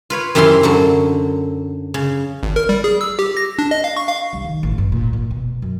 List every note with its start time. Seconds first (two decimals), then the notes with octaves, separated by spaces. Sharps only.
0.10 F4 B4 C#5
0.35 F#2 C3 E3 E4 F5 C6
0.63 F#2 D3 F#3
1.94 C#3
2.43 G#1
2.56 A#4
2.69 G3
2.84 G#4
3.01 E6
3.19 G4
3.37 A#6
3.59 D4
3.71 D#5
3.84 F5
3.97 C#6
4.08 F5
4.33 C2
4.44 D#3
4.63 A1
4.78 G2
4.92 A#2
5.13 A#2
5.31 B2
5.62 F#2